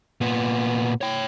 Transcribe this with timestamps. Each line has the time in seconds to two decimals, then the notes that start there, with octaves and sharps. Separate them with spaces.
0.21 A#2 B3
1.01 C#5 G5